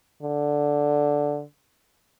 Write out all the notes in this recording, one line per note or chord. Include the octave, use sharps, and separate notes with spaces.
D3